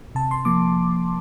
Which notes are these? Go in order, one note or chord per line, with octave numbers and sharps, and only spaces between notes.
C3 A5
C6
F3 A#3 D6